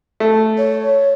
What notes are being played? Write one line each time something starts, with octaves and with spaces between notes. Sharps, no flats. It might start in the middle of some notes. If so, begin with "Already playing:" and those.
A3
C#5